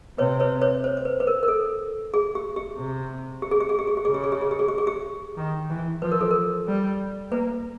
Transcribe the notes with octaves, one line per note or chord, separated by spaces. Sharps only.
C3 B4 C#5
B4 C#5
B4 C#5
C5
C5
B4
B4
A#4
A#4
A4
G#4
G4
G4
C3
G4
G#4
G4
G#4
G4
G#4
G4
C#3 G#4
G4
G#4
G4
G#4
G4
G#4
G4
G#4
G4
D#3
E3
F3 B4
A#4
A4
A#4
G3
A#3 B4